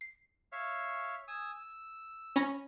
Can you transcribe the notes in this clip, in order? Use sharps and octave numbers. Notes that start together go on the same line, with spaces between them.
C7
C#5 E5 F5
G#5 D#6 E6
E6
C#4 B5 A#6